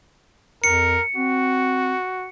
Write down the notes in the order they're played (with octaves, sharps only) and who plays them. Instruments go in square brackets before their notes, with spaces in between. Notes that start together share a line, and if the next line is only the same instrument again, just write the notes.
[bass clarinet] F2 [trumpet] A#4 [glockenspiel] C#7
[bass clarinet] C4 [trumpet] F#4